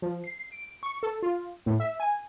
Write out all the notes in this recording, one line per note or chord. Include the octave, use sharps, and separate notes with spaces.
F3
C7
D7
C#6
A4
F4
A2
E5
G#5